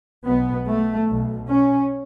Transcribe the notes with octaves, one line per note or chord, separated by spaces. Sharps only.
B1 B2 B3
A3
B1 B2
C#4